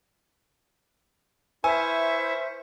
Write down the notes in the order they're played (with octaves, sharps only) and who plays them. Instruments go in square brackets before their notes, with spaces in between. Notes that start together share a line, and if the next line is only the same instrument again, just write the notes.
[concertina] E4 C#6 [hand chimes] B4 E6 [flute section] C5 E5 [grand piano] G#5